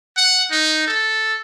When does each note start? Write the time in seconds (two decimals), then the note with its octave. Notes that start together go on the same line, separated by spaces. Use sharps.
0.17 F#5
0.51 D#4
0.87 A4